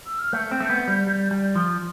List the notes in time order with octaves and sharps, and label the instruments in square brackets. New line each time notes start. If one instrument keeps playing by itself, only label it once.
[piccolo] E6
F6
[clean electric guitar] A3 [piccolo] G6
[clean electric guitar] C4
A3
B3
G3
G3
G3
F3